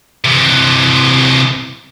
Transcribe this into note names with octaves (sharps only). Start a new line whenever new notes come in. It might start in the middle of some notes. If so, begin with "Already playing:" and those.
C3 E3